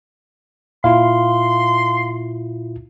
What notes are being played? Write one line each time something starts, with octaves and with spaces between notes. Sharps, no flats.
A#2 E4 F4 F5 C6